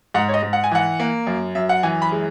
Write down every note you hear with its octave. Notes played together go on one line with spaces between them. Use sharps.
G#2 F#5
C#5
D#5
G#2
F#5
G#5
E3 F#5
A#3
F#2
F#2 E5
F#5
E3 G#5
B5
G#3